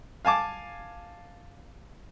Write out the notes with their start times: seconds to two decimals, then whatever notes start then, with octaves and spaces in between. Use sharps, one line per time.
0.25 F5 G#5 A5 D6